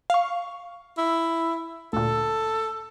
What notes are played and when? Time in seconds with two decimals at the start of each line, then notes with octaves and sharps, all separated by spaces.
0.10 F5 C#6
0.98 E4
1.93 D2 A#2 A4